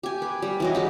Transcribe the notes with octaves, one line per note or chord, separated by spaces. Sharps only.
G4 G#5
B4
G3
E3 F#3 D#5
E3 G#3 G4